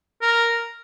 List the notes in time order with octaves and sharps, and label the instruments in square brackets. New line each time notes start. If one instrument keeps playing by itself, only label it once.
[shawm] A#4